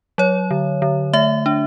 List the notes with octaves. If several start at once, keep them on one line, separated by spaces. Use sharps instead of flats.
F#3 C#5
D3
D3
A3 E5
D4